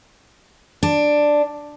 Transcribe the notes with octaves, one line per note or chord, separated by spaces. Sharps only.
D4